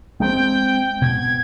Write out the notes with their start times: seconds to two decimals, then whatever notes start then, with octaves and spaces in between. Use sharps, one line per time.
0.20 G#3 A3 C4 G5
1.02 B2 G#6